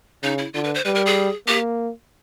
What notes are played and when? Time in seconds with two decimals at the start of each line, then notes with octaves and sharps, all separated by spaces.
0.23 C#3 D#4
0.38 E4
0.54 D3 F4
0.64 B4
0.75 C5
0.85 G3 B4
0.95 A#4
1.06 G#4
1.47 A#3 G4